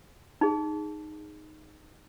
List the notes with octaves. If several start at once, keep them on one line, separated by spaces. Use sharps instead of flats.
D#4 G#4